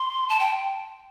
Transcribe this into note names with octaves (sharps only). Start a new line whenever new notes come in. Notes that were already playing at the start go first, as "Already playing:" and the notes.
Already playing: C6
A5
G5